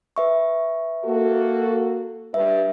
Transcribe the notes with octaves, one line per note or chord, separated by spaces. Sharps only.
B4 E5 C#6
A#3 F#4 A4
G2 B4 E5